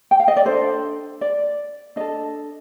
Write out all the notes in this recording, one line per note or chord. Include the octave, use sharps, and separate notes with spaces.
G5
F5
D#5
D5
D4 A4 C5
D5
D4 A4 D#5